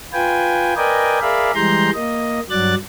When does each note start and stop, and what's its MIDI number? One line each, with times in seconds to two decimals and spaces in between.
0.13 0.74 65
0.13 0.74 71
0.13 0.74 79
0.13 0.74 80
0.77 1.19 70
0.77 1.19 71
0.77 1.19 74
0.77 1.19 75
0.77 1.19 79
0.77 1.19 80
1.21 1.51 68
1.21 1.51 70
1.21 1.51 74
1.21 1.51 76
1.21 1.51 77
1.21 1.51 83
1.55 1.90 52
1.55 1.90 55
1.55 1.90 56
1.55 1.90 82
1.55 1.90 84
1.55 1.90 91
1.95 2.40 58
1.95 2.40 75
2.50 2.75 43
2.50 2.75 54
2.50 2.75 74
2.50 2.75 90
2.50 2.75 93